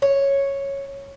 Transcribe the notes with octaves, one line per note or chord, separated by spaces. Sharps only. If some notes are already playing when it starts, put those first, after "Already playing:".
C#5